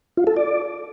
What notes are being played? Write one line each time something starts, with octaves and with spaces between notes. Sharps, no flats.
F4
A4
D5